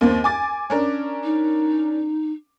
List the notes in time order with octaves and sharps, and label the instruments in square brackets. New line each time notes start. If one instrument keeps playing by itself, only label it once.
[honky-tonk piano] D#2 A#3 C4
G#5 D6 A6
C#4 D4 A#4
[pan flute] D#4